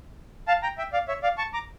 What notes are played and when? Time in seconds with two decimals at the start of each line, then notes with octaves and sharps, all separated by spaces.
0.48 F5 A5
0.63 G5 A#5
0.78 E5 G5
0.93 D5 F5
1.08 C#5 E5
1.23 D5 F5
1.38 A5 C#6
1.53 A#5 D6